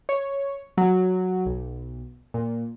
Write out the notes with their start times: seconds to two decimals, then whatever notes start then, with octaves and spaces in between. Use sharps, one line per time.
0.09 C#5
0.78 F#3
1.46 B1
2.34 A#2